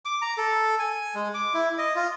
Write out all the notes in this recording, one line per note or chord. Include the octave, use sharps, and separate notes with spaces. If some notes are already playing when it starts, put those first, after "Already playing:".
D6
A#5
A4
G#5
G#3
D6
E4
D#5
F4